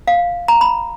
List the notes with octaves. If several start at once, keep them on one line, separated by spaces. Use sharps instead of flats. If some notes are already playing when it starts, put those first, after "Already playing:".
F5
A#5
B5